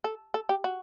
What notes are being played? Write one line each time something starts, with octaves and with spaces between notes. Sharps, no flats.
A4
A4
G4
F#4